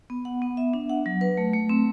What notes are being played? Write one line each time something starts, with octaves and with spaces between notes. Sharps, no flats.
B3
F#5
B3
E5
D4
F#5
F#3
B4
A3
A3
C4